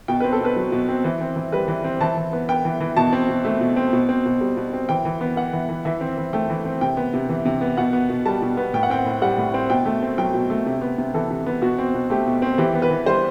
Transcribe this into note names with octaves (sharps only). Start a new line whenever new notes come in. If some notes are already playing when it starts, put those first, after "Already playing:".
B2 G5
C4 B4
A4
B2 B4
F#3
B2
C4
E3
C4
E3
G3 B4
E3
C4
E3 A5
E3
B3
B3 G5
E3
E3
B2 A5
C4
B2
A3
B2
C4
B2
C4
B2
G3
B2
C4
E3 G5
E3
B3
B3 F#5
E3
E3
E3 E5
C4
E3
A3 G5
E3
C4
C3 G5
B3
C3
E3
C3
B3
B2 F#5
B3
B2
G3 A5
B2
B3
A2 G5
F#5
C4 G5
A2
G3 F#5
A2
C4
B2 G5
A3
C4
F#3 G5
B2
A3
C3
B3
C3
E3 A4
C3
B3
B2 F#4
C4
B2
A3 G4
B2
C4
E3 G4
B3
B4
E3
G3 C5